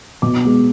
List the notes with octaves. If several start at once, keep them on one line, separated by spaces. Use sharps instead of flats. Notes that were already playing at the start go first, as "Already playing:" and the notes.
B2 D6
G#3 B3